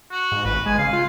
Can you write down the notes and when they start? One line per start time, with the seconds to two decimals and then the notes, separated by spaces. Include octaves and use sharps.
0.11 F#4
0.32 G#2
0.45 G#1 B4
0.66 G#3 G#5
0.79 C#3 F5
0.93 F4